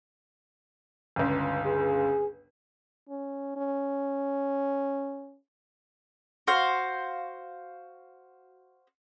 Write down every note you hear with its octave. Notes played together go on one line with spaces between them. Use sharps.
G1 C#2
G#4
C#4
C#4
F#4 C5 F5